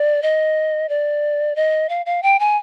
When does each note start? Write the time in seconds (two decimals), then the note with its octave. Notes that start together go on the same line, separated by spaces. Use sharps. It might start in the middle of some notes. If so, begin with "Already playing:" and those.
Already playing: D5
0.23 D#5
0.89 D5
1.56 D#5
1.89 F5
2.06 F5
2.23 G5
2.39 G#5